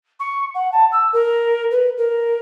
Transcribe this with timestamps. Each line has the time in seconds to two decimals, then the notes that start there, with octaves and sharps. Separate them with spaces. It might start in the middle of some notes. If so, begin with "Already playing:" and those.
0.20 C#6
0.55 F#5
0.72 A5
0.92 E6
1.13 A#4
1.71 B4
1.98 A#4